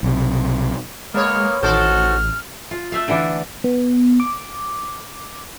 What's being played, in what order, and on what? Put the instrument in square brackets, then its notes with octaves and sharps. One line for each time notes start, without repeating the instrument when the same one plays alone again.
[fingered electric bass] B1 C3
[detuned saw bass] G#3 [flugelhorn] A#3 [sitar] B3 C#5 [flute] F6
[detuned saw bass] A1 [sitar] D#3 A4 C5 [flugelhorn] F#4 [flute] F6
[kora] F4
A3 E5 F5
D3 E3 D4
[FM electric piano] B3
D6